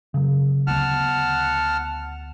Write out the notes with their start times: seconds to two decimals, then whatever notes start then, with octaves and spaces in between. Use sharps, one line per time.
0.14 C#3 F#3
0.67 D2 B3 F#5 A5 F6